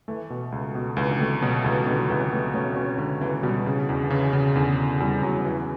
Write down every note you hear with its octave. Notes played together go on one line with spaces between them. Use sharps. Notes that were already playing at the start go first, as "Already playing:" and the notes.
E3 A3
B2
C#2
B2
C#2 E3
D3
E3 A3
B2 F#3
C#2 E3
B2 D3
F#3
C#2 E3
A3 B3
A3 C#4
B2 C#4
C#2 D3
C#2 E3
B2 G3
C#3
E2
D3
C#3 E3
C#3
E2 D3
C#3
E2 G3
E2 F#3
E2 E3